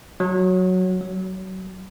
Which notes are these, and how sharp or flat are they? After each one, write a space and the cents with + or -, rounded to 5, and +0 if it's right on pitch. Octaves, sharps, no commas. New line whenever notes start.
F#3 -5
F#3 +25